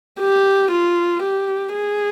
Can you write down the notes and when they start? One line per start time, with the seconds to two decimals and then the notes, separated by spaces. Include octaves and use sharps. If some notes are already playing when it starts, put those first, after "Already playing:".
0.20 G4
0.72 F4
1.23 G4
1.74 G#4